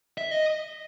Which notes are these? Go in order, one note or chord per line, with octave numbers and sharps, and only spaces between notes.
E5
D#5